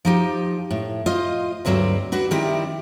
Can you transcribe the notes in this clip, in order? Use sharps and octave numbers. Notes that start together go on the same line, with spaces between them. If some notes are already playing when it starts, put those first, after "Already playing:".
F3 D#4 G4
A2
F4 C5 D#5
D2 G2 F#3 G3 C4
D4 F#4 B4
D#3 G3 C4 E4 G4